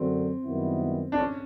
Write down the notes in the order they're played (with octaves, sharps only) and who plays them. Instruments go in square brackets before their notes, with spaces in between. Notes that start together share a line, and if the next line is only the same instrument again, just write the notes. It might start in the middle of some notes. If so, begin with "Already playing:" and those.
Already playing: [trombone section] F#2 D3 F#3 [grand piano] C4
[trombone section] F#2 D#3 G3 B3 E4
[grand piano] D4
C#4